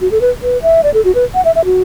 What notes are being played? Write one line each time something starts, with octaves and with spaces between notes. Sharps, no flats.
F#4
A4
B4
B4
E5
D5
A4
F#4
B4
F#5
E5
E5
F#4